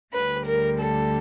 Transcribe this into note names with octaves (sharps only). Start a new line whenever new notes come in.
D2 D3 G3 B4
A#4
A4